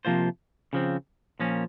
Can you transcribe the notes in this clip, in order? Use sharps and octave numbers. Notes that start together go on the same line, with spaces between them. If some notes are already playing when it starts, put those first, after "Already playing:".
C3 F3 A#3 F4 C5
C#3 F3 C4
A#2 F3 A#3 C#4